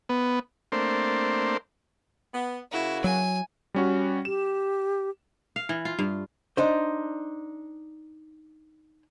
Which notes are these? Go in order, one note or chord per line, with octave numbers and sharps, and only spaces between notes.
B3
A3 A#3 C4 D4 C5
B3
C#3 A#3 E4 F#4
F#3 G#5
G3 C#4 F#4
G4 E7
F5
E3
F4
G2
D4 D#4 C5